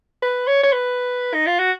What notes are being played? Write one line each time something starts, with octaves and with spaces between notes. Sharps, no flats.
B4
C#5
C#5
B4
D#4
F4
F#4